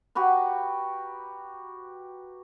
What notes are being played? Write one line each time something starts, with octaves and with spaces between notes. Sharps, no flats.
F#4 G4 B4 A#5